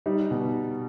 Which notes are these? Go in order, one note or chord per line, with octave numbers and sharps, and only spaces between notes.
G3 D#4
B2